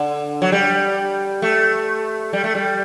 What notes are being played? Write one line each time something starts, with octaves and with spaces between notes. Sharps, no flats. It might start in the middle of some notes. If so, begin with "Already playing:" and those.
Already playing: D3
F#3
G3
A3
G3
A3
G3